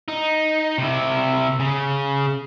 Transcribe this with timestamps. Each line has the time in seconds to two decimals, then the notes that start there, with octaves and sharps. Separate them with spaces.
0.08 D#4
0.78 C3 E4
1.60 C#3